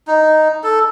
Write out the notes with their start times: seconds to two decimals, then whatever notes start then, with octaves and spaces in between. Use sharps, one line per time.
0.07 D#4
0.63 A4